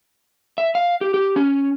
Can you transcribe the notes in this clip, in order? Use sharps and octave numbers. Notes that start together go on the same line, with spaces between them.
E5
F5
G4
G4
C#4